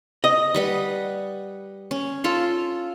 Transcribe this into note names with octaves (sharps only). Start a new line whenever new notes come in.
D#5
G3 B4 F#5
C#4
F4 A4 F5